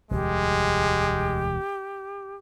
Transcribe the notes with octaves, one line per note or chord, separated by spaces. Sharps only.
E1 D2 G3 G#3 G4